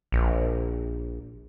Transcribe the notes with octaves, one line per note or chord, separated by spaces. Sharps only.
A#1